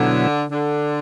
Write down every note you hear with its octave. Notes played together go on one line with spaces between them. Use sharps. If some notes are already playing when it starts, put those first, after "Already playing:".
Already playing: B2 D3 F#3 B3 E4
D3